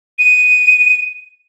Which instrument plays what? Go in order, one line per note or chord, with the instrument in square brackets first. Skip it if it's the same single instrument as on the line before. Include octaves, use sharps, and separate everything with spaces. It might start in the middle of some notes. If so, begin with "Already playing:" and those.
[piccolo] D#7